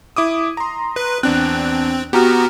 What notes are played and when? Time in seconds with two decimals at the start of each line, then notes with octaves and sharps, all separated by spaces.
0.16 E4 D6 D#6
0.57 A#5 C6
0.96 B4
1.23 E2 C4 D4 F#6
2.13 B3 F#4 G4 A#5 F6